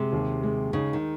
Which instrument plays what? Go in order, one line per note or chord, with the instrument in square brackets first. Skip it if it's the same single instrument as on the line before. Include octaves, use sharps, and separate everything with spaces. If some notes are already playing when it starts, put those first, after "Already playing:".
Already playing: [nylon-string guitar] C3 [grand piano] G#3
[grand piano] D#2
G#3
[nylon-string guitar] C#3 [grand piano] D#4
[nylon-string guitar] D#3